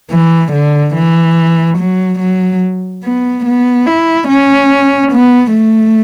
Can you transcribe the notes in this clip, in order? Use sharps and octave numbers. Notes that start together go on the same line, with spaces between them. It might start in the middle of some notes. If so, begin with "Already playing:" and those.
E3
D3
E3
F#3
F#3
B3
B3
E4
C#4
B3
A3